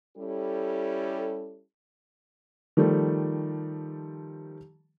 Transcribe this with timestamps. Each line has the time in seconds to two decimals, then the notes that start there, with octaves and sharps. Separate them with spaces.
0.17 G3 C#4 E4 G4 A4
2.77 D#3 F3 G3 A3